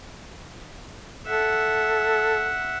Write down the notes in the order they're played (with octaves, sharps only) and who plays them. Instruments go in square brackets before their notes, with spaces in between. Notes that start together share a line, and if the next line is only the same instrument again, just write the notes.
[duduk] A4 [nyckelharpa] E5 F#5